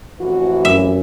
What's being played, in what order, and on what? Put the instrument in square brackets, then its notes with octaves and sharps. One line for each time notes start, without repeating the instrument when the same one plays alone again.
[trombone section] A1 F2 E3 [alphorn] F#4
[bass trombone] F#2 [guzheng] E5